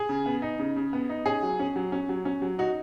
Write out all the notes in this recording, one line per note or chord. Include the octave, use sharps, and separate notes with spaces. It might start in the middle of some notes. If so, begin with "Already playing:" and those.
Already playing: G#4
C#3
B3
D#4
C#3
C#3
B3
D#4
C#4 G#4
F#3
C#4
F#3
C#4
F#3
C#4
F#3
D#4 F#4